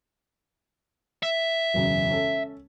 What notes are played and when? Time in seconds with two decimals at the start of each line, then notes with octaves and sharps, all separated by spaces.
1.23 E5
1.74 E1 F#2 C#3
2.10 C#4 A4